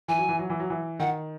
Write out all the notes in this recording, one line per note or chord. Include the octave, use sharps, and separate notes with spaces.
E3 G#5
F#3
E3
F#3
E3
F#3
E3
D#3 F#5